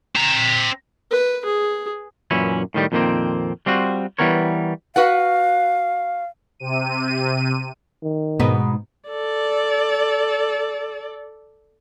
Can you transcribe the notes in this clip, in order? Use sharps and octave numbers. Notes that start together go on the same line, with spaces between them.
C4 A#5
B4
G#4
F#2 A#2 E3 C#4 E4
A2 D#3 G3
F2 A#2 D#3 G#3 A#3 C4
G3 C4 F4 F#4
E3 G3 B3 A#4 C#5
F#4 B4 F5 F#5
C3 D#7
D#3
G#2 B2 B3 D#4
A4 D5